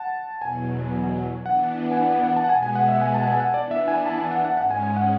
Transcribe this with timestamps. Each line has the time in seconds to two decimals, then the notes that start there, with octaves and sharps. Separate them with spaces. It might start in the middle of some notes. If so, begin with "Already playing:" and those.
Already playing: F#5 A5
0.42 E2 B2 F#3 G#5
1.45 E3 B3 D4 F#5
1.91 G#5
1.97 F#5
2.10 F#5
2.23 F#5
2.37 A5
2.44 F#5
2.49 B2 G#3 B3 G#5
2.63 G#5
2.75 F#5
2.88 E5
3.01 G#5
3.14 A5
3.27 G#5
3.40 F#5
3.54 E3 B3 D4 D5
3.71 E5
3.88 G#5
4.06 A5
4.18 G#5
4.31 F#5
4.45 F#5
4.57 G#2 G#3 C#4 F#5
4.71 G#5
4.83 G#5
4.97 F#5